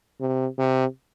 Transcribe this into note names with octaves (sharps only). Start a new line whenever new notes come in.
C3
C3